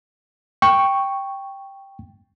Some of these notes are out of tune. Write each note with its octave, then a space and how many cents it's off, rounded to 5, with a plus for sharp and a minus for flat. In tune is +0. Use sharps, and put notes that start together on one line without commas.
G5 +0 C#6 +0